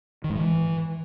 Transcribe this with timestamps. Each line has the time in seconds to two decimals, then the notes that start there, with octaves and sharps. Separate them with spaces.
0.24 D#3
0.30 G#2
0.35 E3